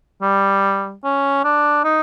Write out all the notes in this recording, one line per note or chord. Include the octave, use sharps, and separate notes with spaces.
G3
C#4
D4
D#4